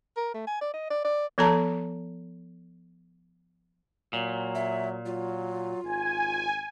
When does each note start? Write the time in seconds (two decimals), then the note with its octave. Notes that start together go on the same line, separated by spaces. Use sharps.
0.17 A#4
0.34 A3
0.47 G#5
0.61 D5
0.74 D#5
0.90 D5
1.05 D5
1.38 F3 B3 A4 A5 A#5
4.13 A#2 F#3
4.55 E5
5.05 F#3 F4
5.84 G#1 G#5